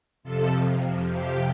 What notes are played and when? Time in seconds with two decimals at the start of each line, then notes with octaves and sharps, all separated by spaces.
0.23 F2 C3 F3 A4
1.13 G4